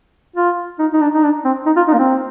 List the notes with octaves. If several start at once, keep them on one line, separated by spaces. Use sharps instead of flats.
F4
D#4
D#4
D4
D#4
D4
C4
D#4
F4
D#4
A#3
C4